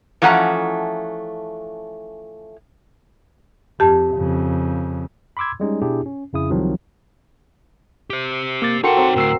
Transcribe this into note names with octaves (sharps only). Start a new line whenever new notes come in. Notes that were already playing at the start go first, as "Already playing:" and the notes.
E3 F3 A3 C#4 F#5 A#5
F2 G4 A5
F2 C#3
B5 C6 D6 E6 G#6
G3 G#3 C#4 D#4
B2 B3 D4 E4 G4 G#4
C#4
F2 C#3 E4 D#6
C2 C3 D#3 F3 F#3 C4
G4 C5
A#3 D6 A6
D#4 F#4 A4 A#4 F#5 G5 C6 C#7
F#3 C4
D2 A2 A#4 E6 C7